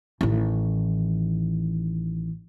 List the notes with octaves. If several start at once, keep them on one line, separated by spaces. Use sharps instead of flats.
A1 D#3